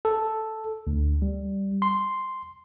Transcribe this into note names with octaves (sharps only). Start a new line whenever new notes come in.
A4
D2
G3
C6